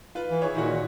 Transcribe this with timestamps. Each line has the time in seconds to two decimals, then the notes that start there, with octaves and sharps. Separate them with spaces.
0.15 F4 B4
0.30 E3
0.42 E4 G#4 C#5
0.55 A#2 D#3 E4 F#4